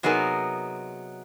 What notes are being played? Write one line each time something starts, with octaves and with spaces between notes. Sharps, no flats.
C3 F#3 B3 D#4 G#4 A#4